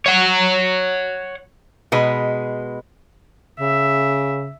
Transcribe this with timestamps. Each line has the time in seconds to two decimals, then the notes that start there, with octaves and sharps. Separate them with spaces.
0.06 C#5 F#5
1.92 B2 G#3 B4 D#5 B5
3.60 C#3 E5